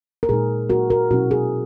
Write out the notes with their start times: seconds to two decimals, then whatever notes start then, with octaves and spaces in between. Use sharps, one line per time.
0.23 A#4
0.29 A#2 G#3 D#4 G#4
0.70 A#2 F#3 A#3 F#4 A#4
0.90 F#4 A#4
1.11 B2 F#3 C#4 E4 F#4
1.31 G#4